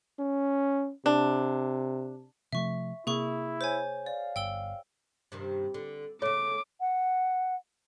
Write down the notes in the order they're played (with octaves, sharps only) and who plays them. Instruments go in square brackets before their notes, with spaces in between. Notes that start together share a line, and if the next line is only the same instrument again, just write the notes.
[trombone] C#4
[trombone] C3 [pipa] D4
[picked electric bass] C3 F3 A3 [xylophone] E5 C#6
[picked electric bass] C3 A#3 [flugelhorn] E4 [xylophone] G#4 C#6
[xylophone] C5 C#5 G#5
[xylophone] D5 [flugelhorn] F5
[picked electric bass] G1 [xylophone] G5 E6 G7
[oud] G2 C3 D#3
D3
[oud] C#3 A3 [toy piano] C#5 [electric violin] D6
[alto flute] F#5